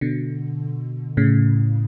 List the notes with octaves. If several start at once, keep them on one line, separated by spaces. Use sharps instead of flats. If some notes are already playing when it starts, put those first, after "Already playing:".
B2 D3
A2 C#3